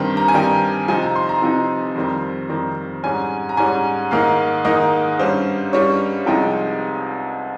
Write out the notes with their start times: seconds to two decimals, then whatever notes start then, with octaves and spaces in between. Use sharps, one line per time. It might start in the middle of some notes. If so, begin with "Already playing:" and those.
Already playing: G2 D#3 G3 C4
0.17 A#5
0.28 G#5
0.34 G2 D#3 G3 C4 G5
0.88 C3 F3 C4 D#4 G#5
1.02 A#5
1.16 C6
1.29 A#5
1.42 C3 F3 C4 D#4
1.95 F2 D#3 G3 C4
2.49 F2 D#3 G3 C4
3.03 G#2 G3 C#4 G#5
3.49 A#5
3.57 G#2 G3 C#4 G#5
4.11 G#2 D#3 A#3 D#4 F5
4.65 G#2 D#3 A#3 D#4 D#5
5.19 G2 G3 C#4 C5
5.73 G2 G3 C#4 C#5
6.26 C2 C3 F3 G#3 D#4 G5